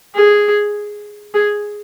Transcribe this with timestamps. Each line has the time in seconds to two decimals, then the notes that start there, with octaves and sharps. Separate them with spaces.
0.15 G#4
1.34 G#4